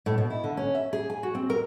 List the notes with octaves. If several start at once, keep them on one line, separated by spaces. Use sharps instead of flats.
A2
B2
E4
D3
C#4
E5
G#4
G#5
F#4
C4
A#4